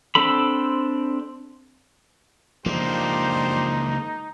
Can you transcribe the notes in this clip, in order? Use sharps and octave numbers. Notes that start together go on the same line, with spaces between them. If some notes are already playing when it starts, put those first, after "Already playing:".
C4 D4 A4 B5
C#2 F3 A#3 D4 D#4 G4 C5